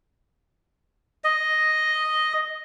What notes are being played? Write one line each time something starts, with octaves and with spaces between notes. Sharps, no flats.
D#5